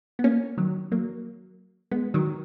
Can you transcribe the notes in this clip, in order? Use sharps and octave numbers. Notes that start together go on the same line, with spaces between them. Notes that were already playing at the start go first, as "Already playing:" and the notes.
B3
A#3 C#4
D#3 F#3
F#3 A#3
G#3 B3
D#3 F#3